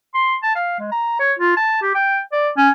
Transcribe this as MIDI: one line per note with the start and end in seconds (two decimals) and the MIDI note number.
0.14 0.35 84
0.43 0.55 81
0.55 0.77 77
0.79 0.90 56
0.92 1.17 82
1.19 1.33 73
1.39 1.54 65
1.57 1.80 81
1.82 1.93 67
1.94 2.20 79
2.32 2.49 74
2.57 2.70 61